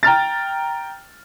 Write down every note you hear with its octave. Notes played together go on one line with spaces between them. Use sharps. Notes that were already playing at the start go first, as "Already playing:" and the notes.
G5 A#5 F6 A6